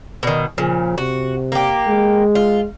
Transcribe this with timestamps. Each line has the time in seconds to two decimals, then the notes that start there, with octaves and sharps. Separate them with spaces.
0.23 B2 D#3
0.58 A#2 C#3 F3
0.98 C3 F#4
1.52 A#3 G4
1.88 G#3
2.35 F4